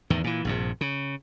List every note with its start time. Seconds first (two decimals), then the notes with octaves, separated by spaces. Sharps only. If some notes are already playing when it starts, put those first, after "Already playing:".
0.10 E2 A2 D#3
0.24 A#2 E3
0.45 A#1 G2 C3
0.81 C#3